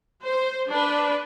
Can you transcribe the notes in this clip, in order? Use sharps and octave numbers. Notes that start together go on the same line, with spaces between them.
C5
D4 B4